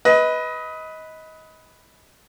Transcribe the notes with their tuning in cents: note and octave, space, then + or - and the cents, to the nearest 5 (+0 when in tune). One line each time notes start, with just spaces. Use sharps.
B4 +0 D#5 +25